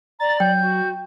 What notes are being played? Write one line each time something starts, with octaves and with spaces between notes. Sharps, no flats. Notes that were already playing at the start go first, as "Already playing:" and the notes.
D5 A#5 A6
F#3 G5 G6
F#4